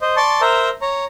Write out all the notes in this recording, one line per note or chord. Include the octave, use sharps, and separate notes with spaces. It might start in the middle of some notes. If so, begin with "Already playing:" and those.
C5 D#5
D5 A5 C6 C#6
A#4 C5 E5 A#5
C#5 A#5